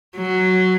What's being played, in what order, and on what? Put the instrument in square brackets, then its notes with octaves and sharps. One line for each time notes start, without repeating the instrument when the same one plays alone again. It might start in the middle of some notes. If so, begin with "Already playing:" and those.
[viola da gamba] F#3